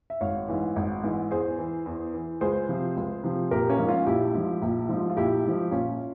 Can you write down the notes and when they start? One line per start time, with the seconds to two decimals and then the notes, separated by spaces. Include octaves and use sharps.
0.10 E5
0.21 G#1 C#5 F5
0.48 G#2 E3
0.76 G#1
1.03 G#2 E3
1.31 E2 G#4 C5
1.59 E3
1.86 E2
2.14 E3
2.41 C#2 G#4 C5
2.69 C3 F3
2.96 C#2
3.24 C3 F3
3.51 A#1 G4 A#4
3.70 A#3 C#4
3.79 G#2 F3
3.88 C#4 F4
4.06 A#1 E4 G4
4.34 G#2 F3
4.62 A#1
4.89 G#2 F3
5.10 F4
5.17 A#1 E4 G4
5.44 G#2 F3
5.71 A#1 C#4 F4